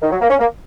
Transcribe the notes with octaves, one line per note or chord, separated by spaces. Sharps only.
D#3
F#3
A#3
C#4
A#3